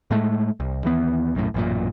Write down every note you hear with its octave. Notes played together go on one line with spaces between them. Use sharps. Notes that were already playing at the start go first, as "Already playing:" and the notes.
A2 G#3 A3
C2
D#2 E3 B3
B1 F#2 A2
A1 F#2 A#2